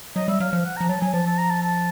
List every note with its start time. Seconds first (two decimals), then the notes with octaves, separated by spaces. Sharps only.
0.16 F#3 D#5
0.28 G3 E5
0.40 F#3 F5
0.52 F3 F5
0.65 F#5
0.77 A#5
0.81 F3
0.89 F#3 A5
1.01 F#3 G#5
1.14 F3 A5
1.26 A5
1.38 A#5
1.50 A5
1.63 A5